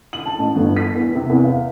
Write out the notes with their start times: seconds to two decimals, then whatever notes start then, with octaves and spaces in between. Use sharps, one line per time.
0.13 F#7
0.26 A5
0.39 A1
0.55 G1
0.77 B6
0.95 E2
1.15 C3
1.29 E2
1.44 F5